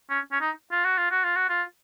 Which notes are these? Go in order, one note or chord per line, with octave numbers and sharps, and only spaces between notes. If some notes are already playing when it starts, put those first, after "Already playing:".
C#4
C#4
D#4
F4
F#4
F4
F#4
F4
F#4
F4